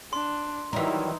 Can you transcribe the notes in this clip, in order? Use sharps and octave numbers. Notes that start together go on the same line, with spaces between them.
D4 C6
D#3 E3 F#3 G3 D#4 A#4